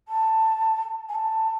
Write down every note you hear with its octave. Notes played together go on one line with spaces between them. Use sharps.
A5
G#5
A5